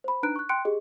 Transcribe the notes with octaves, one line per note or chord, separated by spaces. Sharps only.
C5 B5
D4 D#4 B4 A#5 F#6 D7
C#6 F#6
G5 C6 F#6 C#7 D7
G4 G#4 D#5